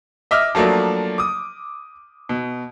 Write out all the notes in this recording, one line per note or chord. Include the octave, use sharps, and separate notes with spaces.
D#5 E5 D6 F6
F3 F#3 A3 A#3 D4
D6 D#6
B2